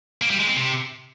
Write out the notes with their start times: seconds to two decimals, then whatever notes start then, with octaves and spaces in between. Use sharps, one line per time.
0.22 A#3
0.30 G3
0.39 G#3
0.48 C4
0.57 C3